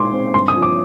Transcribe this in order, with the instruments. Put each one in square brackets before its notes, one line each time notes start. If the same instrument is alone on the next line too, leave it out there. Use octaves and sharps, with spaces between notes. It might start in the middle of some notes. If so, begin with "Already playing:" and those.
Already playing: [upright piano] A#2 G#3 D#4 C6 D6
C4
G2 C6
D#6
F3
D6